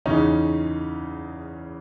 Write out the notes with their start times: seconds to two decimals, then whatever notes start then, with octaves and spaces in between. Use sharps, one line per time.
0.06 E2 C#3 E3 C#4 D#4